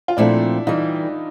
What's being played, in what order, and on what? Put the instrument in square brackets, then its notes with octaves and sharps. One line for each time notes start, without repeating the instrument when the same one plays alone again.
[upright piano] F4
[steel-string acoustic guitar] A#2 F3 A3 C4 [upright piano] D4 E4
[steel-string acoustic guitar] E3 G3 [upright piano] D#4 F4